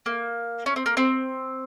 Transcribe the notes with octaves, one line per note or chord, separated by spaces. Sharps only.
A#3
C#4
C4
A#3
C4